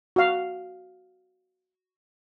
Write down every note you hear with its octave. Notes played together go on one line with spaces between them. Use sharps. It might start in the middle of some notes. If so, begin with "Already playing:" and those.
F#4 F5